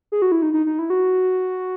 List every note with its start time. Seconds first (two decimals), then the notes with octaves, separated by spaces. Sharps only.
0.12 G#4
0.22 F#4
0.32 E4
0.42 D#4
0.54 D#4
0.66 D#4
0.79 E4
0.90 F#4